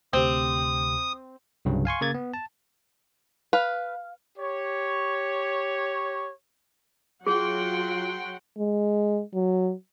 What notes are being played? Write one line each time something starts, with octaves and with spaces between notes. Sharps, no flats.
D2 C3 C4 G4 D#6
C2 G2 C#3 F#3
F5 G#5 C6 C#6
C#3 A#3 G#6 A6
B3
A5
B4 F5
G4 C#5
F#3 F4 G#4 F#5 G5 C6
G#3
F#3